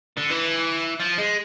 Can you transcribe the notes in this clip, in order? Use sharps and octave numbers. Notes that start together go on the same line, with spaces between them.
D3
E3
F3
G#3